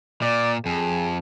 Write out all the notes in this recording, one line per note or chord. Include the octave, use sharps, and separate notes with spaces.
A#2 D5
F2 G#4